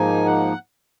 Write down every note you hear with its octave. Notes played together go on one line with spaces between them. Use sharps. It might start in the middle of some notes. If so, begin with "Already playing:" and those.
Already playing: G#2 F3 A#3 D#4 G#5
F#5